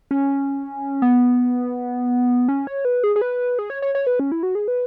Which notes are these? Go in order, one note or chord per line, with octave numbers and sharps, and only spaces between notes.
C#4
B3
C#4
C#5
B4
G#4
G#4
B4
G#4
C#5
C#5
C#5
B4
C#4
E4
F#4
G#4
B4